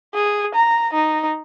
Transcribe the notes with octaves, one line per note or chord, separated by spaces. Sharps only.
G#4
A#5
D#4